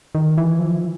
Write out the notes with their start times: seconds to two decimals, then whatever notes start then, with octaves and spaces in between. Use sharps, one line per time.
0.15 D#3
0.38 E3
0.59 F3